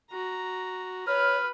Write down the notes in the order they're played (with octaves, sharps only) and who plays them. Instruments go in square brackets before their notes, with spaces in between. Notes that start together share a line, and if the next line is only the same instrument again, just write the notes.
[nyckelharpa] F#4 A#5
[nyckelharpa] B4 [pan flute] C#5 [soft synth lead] F6